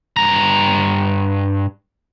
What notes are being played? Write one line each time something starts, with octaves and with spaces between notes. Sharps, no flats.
G2 A#5